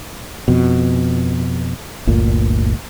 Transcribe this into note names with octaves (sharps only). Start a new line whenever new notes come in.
F2 B2
G1 D2 A#2